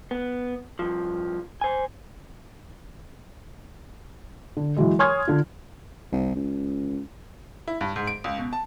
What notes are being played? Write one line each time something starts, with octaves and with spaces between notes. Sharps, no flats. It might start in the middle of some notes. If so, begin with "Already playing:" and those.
B3
G2 F3
C5 G#5
D3
E3 F#3 G#3
C#5 G#5 C6 D#6 F6 G#6
D3 F4
C2
C#2
E4
G2
G#2
D7
C#2
B2
A5